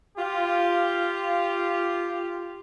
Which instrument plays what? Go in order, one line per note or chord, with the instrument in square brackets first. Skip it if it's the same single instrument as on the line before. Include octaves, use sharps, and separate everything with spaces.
[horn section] F4 G4